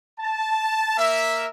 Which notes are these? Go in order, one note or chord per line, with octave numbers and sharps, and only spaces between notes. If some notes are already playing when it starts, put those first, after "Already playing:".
A5
A#3 A#4 E5